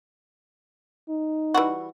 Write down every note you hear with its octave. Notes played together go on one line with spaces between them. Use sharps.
D#4
E3 G3 F#4